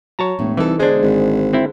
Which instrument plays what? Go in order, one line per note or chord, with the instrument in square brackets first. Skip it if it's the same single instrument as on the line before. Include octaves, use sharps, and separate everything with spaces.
[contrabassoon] F#3 [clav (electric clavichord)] C#5 A5 A#5
[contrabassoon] E1 [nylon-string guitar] A2
[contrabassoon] C2 [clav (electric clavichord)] E3 [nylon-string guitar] D#4 A4
[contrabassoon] E1 [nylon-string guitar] D3 G#4 C5 [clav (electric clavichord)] G#3 D4
[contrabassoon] G#1
[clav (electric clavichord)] C4 E4